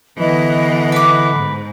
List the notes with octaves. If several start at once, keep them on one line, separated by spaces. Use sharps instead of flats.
D3 E3 B3 D#5
B4 D6
G#2